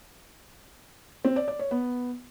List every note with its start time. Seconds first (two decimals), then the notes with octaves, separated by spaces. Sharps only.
1.25 C4
1.36 D5
1.48 D5
1.59 C#5
1.71 B3